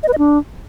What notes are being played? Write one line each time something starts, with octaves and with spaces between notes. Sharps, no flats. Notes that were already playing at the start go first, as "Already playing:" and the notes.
D#5
B4
D#5
D4